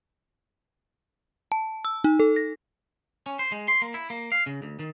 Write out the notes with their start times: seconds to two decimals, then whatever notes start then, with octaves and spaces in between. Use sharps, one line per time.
1.52 A5
1.85 E6
2.04 D#4
2.20 A4
2.36 A#6
3.26 C#4
3.39 C5
3.52 G#3
3.68 C6
3.82 A#3
3.94 E4
4.10 A#3
4.32 F5
4.46 C#3
4.62 D2
4.79 D#3